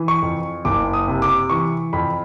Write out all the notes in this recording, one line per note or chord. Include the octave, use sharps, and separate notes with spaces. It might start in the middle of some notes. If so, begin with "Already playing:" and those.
Already playing: E3
C#6
F2
F#1 D6
D#6
C3
D6
E3 C#6
F2 B5